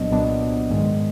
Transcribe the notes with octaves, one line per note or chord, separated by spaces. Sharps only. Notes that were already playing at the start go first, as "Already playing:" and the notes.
Already playing: C2 A#2 F#3 B3 D4 D#5
C2 A#2 F#3 B3 D4
G#2 D#3 G#3